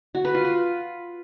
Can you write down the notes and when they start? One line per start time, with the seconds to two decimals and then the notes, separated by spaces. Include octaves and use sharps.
0.15 F#4
0.25 B4
0.35 F4
0.45 B4